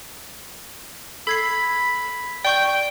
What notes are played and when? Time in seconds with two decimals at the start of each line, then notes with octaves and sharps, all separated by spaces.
1.27 A4 B5 G#6 C7
2.44 D5 G5 C#6 G6